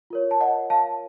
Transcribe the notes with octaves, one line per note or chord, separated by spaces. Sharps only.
F4 A#4 C#5
A5
D#5 F#5
F5 A5